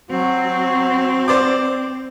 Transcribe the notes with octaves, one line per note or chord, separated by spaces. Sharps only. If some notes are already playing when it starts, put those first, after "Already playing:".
F#3 C4
C5 D5 D6